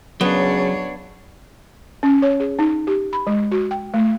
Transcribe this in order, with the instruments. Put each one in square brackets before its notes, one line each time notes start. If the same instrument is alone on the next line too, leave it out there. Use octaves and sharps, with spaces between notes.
[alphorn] C#3 [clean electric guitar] F#3 [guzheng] B3 [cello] D4 C#5
[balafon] C#4
C#5
G#4
D#4
G4
B5
G#3
F#4
G5
A3